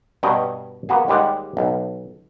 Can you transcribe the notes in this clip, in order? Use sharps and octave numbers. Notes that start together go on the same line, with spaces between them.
G2 B2 C#5 D#5 G5 A#5
A#3 B3 F#4 G#4
D#2 G3 G#3 G4 F#5
B1